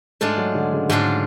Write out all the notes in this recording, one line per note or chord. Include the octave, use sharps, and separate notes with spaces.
G#2 G#3 A3 D4 F4
F#3
D3
C#3
G#2 D3 G#3 D4 F4